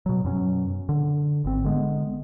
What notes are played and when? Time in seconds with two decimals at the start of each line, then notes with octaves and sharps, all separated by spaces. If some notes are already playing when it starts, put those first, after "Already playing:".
0.06 B2 F#3
0.24 F#2 B2 F#3 C#4
0.89 D3
1.44 G#1 C4
1.65 D3 G#3 B3